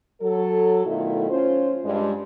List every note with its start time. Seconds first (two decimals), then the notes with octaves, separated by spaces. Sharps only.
0.21 F#3 A4
0.86 B2 D#3 F#3 A3 E4 F4
1.30 C#4 F4 C5
1.84 G2 G#3